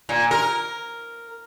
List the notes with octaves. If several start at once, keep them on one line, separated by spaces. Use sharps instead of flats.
A#2
A#4